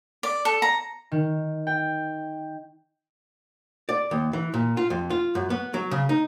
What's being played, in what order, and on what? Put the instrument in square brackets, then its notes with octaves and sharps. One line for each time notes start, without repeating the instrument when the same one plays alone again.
[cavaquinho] D5
A4
A#5
[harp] D#3
G5
[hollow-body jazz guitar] D5
D#2
E3
A#2
F4
F2
F4
F#2
B3
F#3
C#3
D#4